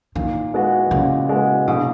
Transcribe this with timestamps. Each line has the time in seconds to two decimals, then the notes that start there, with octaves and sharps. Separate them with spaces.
0.15 A#2 D#3
0.54 G#3 B3 F#4
0.91 A#2 C#3
1.29 G#3 B3 F#4
1.67 A#1 B2